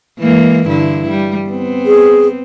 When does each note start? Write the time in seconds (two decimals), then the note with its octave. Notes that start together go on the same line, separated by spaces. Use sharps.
0.19 E3 G#3 A#3
0.68 G2 D3 E4
1.10 G3
1.48 B3 C4
1.86 G#4